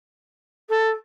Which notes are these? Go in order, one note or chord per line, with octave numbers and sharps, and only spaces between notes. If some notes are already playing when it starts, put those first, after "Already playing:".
A4